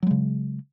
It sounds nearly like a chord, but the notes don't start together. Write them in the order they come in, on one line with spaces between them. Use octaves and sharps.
F#3 G#3 C#3